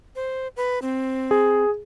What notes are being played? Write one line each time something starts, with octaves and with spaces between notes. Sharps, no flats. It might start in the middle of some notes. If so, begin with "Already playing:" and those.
C5
B4
C4
G#4